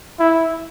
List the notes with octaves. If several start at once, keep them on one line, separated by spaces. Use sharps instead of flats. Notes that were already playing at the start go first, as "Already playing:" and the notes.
E4